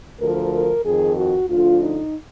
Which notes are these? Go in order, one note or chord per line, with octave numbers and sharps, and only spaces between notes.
D2 D3 F3 A#4
A#4
F2 D#3 G#4
F#4
D2 D3 F3 F4
D#4